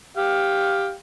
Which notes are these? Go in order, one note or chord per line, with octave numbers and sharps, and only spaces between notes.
G4 F5 G5